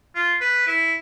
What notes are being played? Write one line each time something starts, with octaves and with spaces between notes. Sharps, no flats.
F4
B4
E4